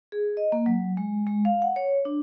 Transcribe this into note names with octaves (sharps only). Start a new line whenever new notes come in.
G#4
D#5
A#3
F#3
G#3
G#3
F5
F#5
C#5
D4